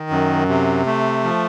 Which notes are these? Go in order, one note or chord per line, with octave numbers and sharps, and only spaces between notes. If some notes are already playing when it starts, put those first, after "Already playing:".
Already playing: D#3
F#2
C3
A3
F3